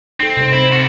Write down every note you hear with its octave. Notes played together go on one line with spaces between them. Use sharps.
C4 D#4 A4
C3 D#4 C5
C4 E4 C5
F#4 A4